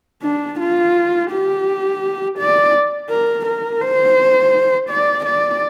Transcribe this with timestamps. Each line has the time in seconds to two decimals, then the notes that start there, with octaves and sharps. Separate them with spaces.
0.23 D4
0.60 F4
1.31 G4
2.39 D5
3.10 A#4
3.46 A#4
3.81 C5
4.90 D5
5.26 D5